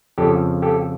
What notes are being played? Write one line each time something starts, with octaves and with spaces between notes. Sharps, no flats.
F2 C#3 F3 G4 A4
G4 A4